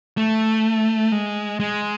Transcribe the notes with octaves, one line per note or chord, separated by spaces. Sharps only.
A3
G#3
G#3